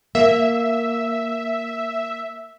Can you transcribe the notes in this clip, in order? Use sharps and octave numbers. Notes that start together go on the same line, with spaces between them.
A#3 E5